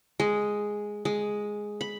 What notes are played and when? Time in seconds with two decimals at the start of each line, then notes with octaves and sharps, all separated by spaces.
0.20 G#3
1.05 G#3
1.81 B5